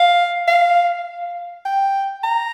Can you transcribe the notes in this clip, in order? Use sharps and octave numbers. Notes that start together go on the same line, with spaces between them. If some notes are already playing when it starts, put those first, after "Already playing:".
Already playing: F5
F5
G5
A#5